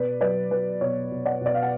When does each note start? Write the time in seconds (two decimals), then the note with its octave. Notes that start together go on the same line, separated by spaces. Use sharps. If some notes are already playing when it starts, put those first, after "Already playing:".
Already playing: B2 B4 D5
0.21 F#3 B4 D5
0.51 F#3 B4
0.81 B2 C#5
1.11 B2
1.26 D5 F#5
1.41 B2 D5
1.54 F5
1.63 F#5